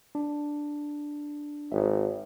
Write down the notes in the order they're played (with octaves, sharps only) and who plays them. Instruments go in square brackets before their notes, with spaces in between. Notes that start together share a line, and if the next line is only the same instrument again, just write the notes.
[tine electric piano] D4
[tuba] G#1 [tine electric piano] E5